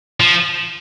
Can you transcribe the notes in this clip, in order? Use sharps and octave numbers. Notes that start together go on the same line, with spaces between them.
F3